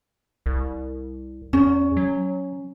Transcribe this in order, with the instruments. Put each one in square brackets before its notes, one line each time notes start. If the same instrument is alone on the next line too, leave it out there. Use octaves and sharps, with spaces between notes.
[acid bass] C2
[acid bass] E2 [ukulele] C#4
[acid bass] F#3